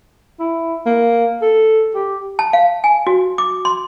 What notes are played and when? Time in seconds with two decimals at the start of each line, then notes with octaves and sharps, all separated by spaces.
0.39 E4
0.86 A#3
1.42 A4
1.95 G4
2.39 A5
2.53 F5
2.84 G#5
3.07 F#4
3.38 D6
3.65 C6